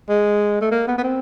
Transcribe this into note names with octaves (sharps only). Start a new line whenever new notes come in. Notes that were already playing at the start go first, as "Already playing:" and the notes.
G#3
A3
A#3
B3
B3
C4